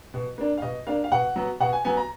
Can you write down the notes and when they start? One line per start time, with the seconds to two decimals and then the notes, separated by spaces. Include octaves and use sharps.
0.14 B2
0.38 A#3 D4
0.58 F5
0.62 B2 D#5
0.87 A#3 D4 F5
1.04 F5
1.12 B2 F#5
1.36 F#3 B3
1.60 B2 F#5
1.73 G#5
1.84 F#3 B3 G#5
1.97 A#5